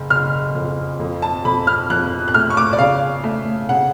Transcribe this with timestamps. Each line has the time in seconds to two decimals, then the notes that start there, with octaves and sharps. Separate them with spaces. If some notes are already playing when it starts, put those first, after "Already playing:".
Already playing: F#1
0.10 F#1 F6
0.55 F2
1.00 F2
1.22 A5
1.45 F2 B5
1.67 F6
1.90 F2 F#6
2.28 F#6
2.34 A3 F6
2.50 C#6
2.57 D6
2.73 D5
2.79 C#3 F5
3.24 A3
3.69 C#3 F#5